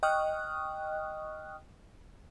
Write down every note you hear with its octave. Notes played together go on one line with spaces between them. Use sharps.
D#5 G5 C#6 D#6 F6 F#6